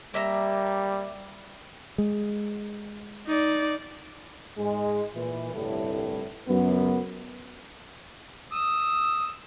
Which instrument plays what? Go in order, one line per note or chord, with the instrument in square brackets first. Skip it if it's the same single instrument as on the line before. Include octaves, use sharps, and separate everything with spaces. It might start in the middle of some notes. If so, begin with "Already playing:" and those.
[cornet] G3 [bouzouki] A#3 E5 A#5
[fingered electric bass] G#3
[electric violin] D#4 D5
[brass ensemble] G#2 G#3
A#2 E3
G1 C2 A2
C#2 F#2 B3
[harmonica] D#6 E6